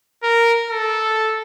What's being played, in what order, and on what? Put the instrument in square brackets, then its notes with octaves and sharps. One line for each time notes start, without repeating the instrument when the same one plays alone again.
[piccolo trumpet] A#4
A4